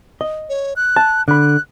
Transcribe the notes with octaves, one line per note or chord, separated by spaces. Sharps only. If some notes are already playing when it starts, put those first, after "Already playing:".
D#5
C#5
F#6
A5
D3 B5 F#6